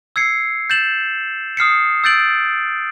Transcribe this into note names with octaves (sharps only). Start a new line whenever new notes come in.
E6 G#6 C7 C#7
G6 A6 E7 F#7
D#6 F6 C7 C#7
E6 G6 A6 D7 F#7